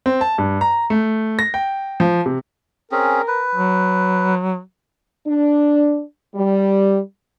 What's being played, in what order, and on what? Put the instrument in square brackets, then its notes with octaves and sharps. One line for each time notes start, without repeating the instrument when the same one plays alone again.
[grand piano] C4
A5
G2
A#5
A3
A#6
G5
F3
C3
[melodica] C4 C#4 G#4 [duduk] A#4
[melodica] B4
[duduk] F#3
[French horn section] D4
G3